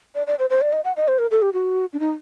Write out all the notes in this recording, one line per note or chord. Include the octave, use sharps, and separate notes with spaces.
D5
D5
C5
C5
D5
D#5
F#5
D#5
C5
A#4
A4
G4
F#4
D4
D#4